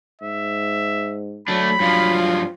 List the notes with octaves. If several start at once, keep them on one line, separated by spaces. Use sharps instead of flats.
G#2 E5
F#3 A3 D4 B5
G2 F3 F#3 F4